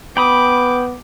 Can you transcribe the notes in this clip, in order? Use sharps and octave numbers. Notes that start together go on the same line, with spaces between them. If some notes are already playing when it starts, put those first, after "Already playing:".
B3 G5 B5 D6 D#6